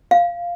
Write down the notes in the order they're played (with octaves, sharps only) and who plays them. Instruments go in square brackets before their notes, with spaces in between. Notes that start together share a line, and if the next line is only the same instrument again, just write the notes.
[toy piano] F5